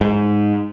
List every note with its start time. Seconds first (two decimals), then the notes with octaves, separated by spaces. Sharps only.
0.01 G#2